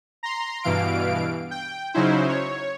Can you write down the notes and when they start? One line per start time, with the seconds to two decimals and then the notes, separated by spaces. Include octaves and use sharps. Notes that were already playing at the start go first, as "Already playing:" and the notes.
0.23 A#5 C6
0.63 G2 B2 E3 F5 D7
1.51 G5
1.94 C#3 F#3 C#4 D#4 E4 C5
2.29 C#5